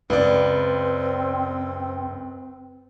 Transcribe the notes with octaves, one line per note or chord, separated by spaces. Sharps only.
C#2 F#2 C4 B4 D5